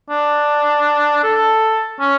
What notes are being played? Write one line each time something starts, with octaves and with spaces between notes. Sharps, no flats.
D4
A4
C#4